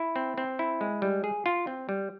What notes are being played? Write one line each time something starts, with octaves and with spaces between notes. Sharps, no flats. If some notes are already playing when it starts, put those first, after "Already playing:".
Already playing: E4
C4
C4
E4
G#3
G3
G#4
F4
C4
G3